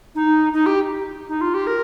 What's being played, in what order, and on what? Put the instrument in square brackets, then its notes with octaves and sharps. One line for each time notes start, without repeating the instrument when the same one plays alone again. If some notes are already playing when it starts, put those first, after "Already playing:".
[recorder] D#4
D#4
G4
D#4
F4
G4
A#4